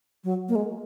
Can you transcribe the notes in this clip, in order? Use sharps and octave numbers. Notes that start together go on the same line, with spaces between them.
F#3
A#3
G#3